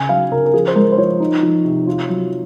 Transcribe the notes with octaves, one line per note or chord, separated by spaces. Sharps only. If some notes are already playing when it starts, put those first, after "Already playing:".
Already playing: C#3 G#5
F#3 F5
C#3 A#4
A#4
F3 G#4
C5
G#3 A#4
C5
F3 C#5
D#4
F3
C3
F4
F#3